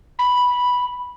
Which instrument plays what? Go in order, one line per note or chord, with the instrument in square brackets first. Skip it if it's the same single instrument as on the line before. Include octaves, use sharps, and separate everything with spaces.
[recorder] B5